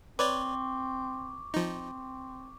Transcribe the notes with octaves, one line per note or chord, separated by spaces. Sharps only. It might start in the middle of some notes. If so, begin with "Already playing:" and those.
C4 B4 C#5 D5 C#6 D6
F3 C4 D#4